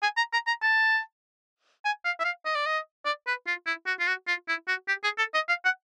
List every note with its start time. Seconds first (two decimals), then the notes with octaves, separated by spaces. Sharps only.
0.03 G#5
0.17 A#5
0.33 A#5
0.47 A#5
0.62 A5
1.85 G#5
2.05 F5
2.20 E5
2.24 F5
2.45 D#5
2.55 D5
2.66 D#5
3.05 D5
3.27 B4
3.47 F4
3.66 E4
3.86 F#4
3.99 F4
4.07 F#4
4.28 F4
4.48 E4
4.68 F#4
4.88 G4
5.04 G#4
5.18 A4
5.34 D#5
5.48 F5
5.65 F#5